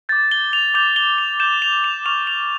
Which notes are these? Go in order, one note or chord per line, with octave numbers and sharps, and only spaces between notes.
D6 G6 A6
G7
F7
D6 G6 F7
G7
F7
D6 G6 E7
F7
F7
C#6 F6 F7
F7